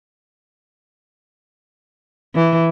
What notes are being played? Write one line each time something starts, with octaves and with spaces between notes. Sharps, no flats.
E3